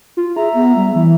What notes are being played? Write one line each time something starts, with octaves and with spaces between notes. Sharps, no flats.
F4
G#4 E5 A#5
B3
G3
E3 E4